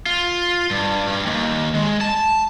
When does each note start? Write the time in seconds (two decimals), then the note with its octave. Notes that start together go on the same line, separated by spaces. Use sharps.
0.06 F4
0.71 G2
1.08 G2
1.26 D#2
1.75 G#3
2.01 A5